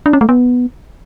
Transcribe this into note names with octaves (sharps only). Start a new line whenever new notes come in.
D4
C#4
A3
B3